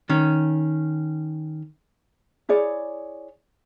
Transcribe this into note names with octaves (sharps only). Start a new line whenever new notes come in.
D#3 C#4
E4 G#4 C#5 D5